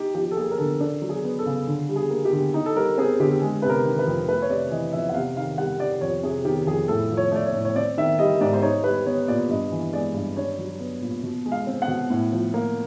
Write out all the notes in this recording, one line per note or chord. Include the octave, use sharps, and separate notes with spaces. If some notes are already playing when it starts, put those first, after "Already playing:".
Already playing: D#4 G4
F3 G4
A4
A#3 G#4
A#4
D3 A4
D4 A4
F#3
G#4
B3
A4
C#3
D3
G3
G#4
A#3
G4
D3
D#4
A4
G3 A#4
C4 G#4
D3 G4
G#3
C3 B4
A#4
D#3
B4
F2
A3 B4
C#5
C3 D5
E3 D#5
F2 E5
F#5
C3 F5
D#3 F5
G3 F#5
C3 D5
F2 C#5
C3 G#4
D#3 G4
F2 G#4
A2 A4
F3
C#5
A3 D5
C#5
A2
C#5
C4 D5
D#3 E5
G3 D#5
G#2 D5
C5
D#4 C#5
G3 B4
B3 C#5
A#2 D5
G2 D#5
E3
G#3 D5
G2
D4 C#5
F#3
B3
A#2
B2
G#3
F5
C4
F#5
B2
A2
F3
A#3